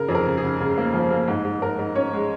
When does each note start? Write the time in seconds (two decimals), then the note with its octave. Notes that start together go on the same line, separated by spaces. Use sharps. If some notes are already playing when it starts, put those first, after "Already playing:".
Already playing: C#3 A#4
0.08 F2 G#4
0.15 A#4
0.27 C#3
0.37 G#4
0.43 C#3
0.60 C#3
0.78 A#3
0.94 F3
1.10 A#3
1.28 G#2
1.44 G#2
1.62 G#2 A#4
1.79 G#2
1.95 C#4 C#5
2.13 G#3